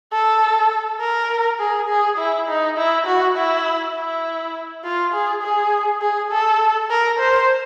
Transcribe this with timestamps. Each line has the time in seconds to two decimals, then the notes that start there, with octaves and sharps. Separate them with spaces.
0.12 A4
1.00 A#4
1.59 G#4
1.89 G#4
2.18 E4
2.48 D#4
2.77 E4
3.06 F#4
3.36 E4
3.95 E4
4.84 F4
5.13 G#4
5.42 G#4
6.01 G#4
6.30 A4
6.90 A#4
7.19 C5